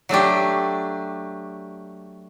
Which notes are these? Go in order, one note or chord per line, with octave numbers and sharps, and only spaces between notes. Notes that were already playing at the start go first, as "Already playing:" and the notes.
F#3 A3 D4 G4